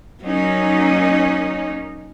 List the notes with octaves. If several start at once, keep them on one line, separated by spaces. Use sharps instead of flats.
F#3 A#3 C#4 D#4